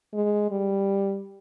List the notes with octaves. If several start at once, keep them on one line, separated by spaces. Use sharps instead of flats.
G#3
G3